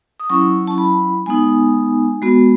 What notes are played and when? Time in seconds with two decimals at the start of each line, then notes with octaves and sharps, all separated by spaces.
0.20 D#6
0.30 F#3 C#4 E4 C#6
0.67 A5
0.78 B5
1.26 G#3 B3 D#4 G#5
2.22 G#3 B3 F#4